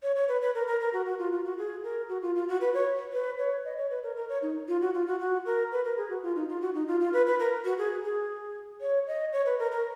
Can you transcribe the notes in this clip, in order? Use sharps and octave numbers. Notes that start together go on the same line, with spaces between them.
C#5
C#5
B4
B4
A#4
A#4
A#4
F#4
F#4
F4
F4
F#4
G#4
A#4
F#4
F4
F4
F#4
B4
C#5
B4
C#5
D#5
C#5
B4
A#4
A#4
C#5
D#4
F4
F#4
F4
F#4
F#4
A#4
B4
A#4
G#4
F#4
F4
D#4
F4
F#4
D#4
F4
F4
B4
B4
A#4
F#4
G#4
G#4
C#5
D#5
C#5
B4
A#4
A#4